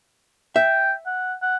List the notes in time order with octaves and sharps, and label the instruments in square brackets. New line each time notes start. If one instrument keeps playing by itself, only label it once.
[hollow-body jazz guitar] E5 [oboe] G5
[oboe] F#5
F#5